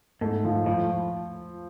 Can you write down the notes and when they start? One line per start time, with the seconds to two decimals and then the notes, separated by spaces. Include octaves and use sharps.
0.21 G#2 A3
0.45 F3
0.66 A2 F3